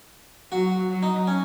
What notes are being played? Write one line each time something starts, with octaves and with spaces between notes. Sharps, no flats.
F#3 F#4
F#3
D#4
C#4